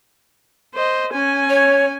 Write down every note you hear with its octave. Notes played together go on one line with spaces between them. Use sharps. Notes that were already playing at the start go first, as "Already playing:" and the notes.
C5 D#5
C#4 G#5
C#5